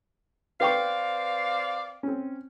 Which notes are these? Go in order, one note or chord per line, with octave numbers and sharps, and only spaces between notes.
C4 B4 D5 F5 G5 C#6
C4 C#4